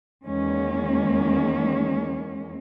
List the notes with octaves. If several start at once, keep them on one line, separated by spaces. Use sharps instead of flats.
E2 D#3 G#3 A#3 C#4